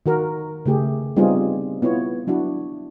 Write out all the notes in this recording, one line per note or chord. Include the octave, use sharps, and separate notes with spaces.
D#3 F#4 A#4
C#3 A3 G4 G#4
G3 B3 C4 D#4 F4 G#4
B3 E4 F4 C#5
F#3 D4 E4 F#4